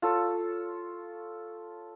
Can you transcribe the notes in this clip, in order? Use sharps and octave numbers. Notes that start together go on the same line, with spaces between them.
F4 A4 C#5